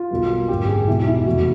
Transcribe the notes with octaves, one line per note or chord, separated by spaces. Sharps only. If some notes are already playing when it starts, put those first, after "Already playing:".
Already playing: F4
B1 B2 G3 A#3
G#1 F#2 D3 G4
G#4
E2 B2 G#3 E4
E4
F1 E2 C3 E3 A3 F#4